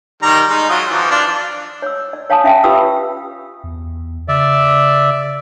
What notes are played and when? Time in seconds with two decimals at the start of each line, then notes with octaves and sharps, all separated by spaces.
0.23 D#3 G3 A#5
0.48 G#3 D#4
0.70 F#3 F4 D#6
0.90 E3 F3
1.11 D4 F4
1.82 C#5 E6
2.13 D5
2.30 C#5 F5 G#5 A5 D#6
2.44 C#4 E5 F5 G5
2.64 F4 G4 B4 G5 D#6 E6
3.64 E2
4.28 C#3 D5 E5